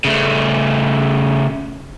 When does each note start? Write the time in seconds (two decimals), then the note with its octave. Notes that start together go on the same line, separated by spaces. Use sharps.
0.04 C#3 A3